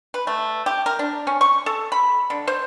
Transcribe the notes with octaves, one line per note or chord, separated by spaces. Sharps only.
B4
A3
G4
A#4
D4
C#4
C#6
A4
B5
D3
C5